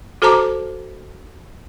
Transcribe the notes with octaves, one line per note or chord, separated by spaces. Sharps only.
F#4 A4 C5 A5 A#5 D6